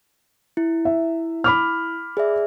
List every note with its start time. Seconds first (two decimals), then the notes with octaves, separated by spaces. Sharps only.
0.57 E4
0.85 E5
1.44 B5 D6 F6
2.17 G#4 D5 E5